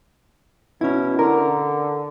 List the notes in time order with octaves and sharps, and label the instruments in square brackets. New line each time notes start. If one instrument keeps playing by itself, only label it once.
[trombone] B2 [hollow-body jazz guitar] C#4 E4
[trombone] D3 [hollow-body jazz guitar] A#4